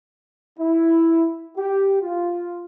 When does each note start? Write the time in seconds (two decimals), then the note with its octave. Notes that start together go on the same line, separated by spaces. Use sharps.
0.59 E4
1.57 G4
2.01 F4